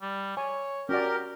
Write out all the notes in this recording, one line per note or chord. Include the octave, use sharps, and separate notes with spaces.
G3
C#5 G#5
C#4 F#4 G4 A#4 D5